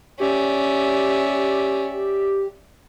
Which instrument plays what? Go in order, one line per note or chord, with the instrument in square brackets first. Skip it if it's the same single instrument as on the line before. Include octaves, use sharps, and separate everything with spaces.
[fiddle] C#4 [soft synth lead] G4 [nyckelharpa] D5 E5